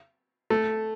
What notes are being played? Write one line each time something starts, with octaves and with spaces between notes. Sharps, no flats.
A3